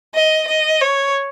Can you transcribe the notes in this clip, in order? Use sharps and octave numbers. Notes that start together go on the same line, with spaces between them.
D#5
D#5
C#5